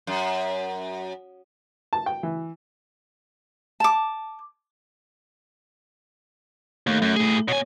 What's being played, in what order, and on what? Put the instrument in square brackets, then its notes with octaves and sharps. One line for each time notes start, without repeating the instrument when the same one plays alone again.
[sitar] F#2
[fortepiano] A5
G5
E3
[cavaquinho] A5 D6
[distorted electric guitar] D#2 [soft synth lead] A3
[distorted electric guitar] F#2
A2 G#4
[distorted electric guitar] B2 G#5 [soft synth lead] C#5